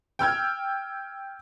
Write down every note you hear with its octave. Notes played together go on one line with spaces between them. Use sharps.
G5 E6 F6 G#6